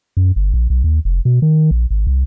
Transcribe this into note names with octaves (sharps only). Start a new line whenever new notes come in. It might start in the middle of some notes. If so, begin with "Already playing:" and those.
F#2
G1
A#1
B1
D#2
F1
B2
D#3
A#1
G#1
C2